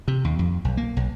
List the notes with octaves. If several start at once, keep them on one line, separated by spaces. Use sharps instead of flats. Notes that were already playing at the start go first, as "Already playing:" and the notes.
C3
D#2
F2
B1
A#3
B1